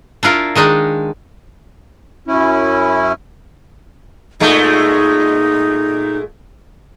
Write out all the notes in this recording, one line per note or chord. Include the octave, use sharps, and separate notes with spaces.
D4 E4 F4 A#4
D#3 G#3 D4 D#4
F#2 C#4 E4
A#2 G#3 A3 D#4